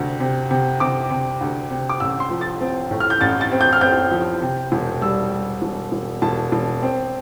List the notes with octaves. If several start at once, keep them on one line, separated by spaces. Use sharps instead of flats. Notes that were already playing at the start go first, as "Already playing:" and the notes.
Already playing: D2 C3
C3
C3
C3 D6
C3
D2
C3
D6
A1 E6
C6
F3
A6
C4
A2
F6
G6
A1 A6
A6
C4
G6
F6
C4 G6
F3
C3
E1
G3 E6
G3
E1
E1
E1 A5
E1
C4